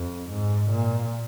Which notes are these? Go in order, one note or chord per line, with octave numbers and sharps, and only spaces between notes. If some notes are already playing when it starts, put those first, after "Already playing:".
Already playing: F2
G#2
A#2